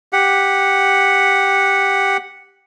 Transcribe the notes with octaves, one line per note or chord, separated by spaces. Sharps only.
G4 F#5